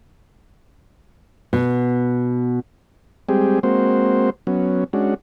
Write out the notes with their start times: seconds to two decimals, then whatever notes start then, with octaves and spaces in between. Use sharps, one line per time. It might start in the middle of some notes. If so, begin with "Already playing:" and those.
1.53 B2
3.29 G3 G#3 C4 G4 G#4
3.63 G#3 A#3 C4 F#4 C5
4.47 F#3 B3 C#4
4.93 G#3 C#4 D4 F#4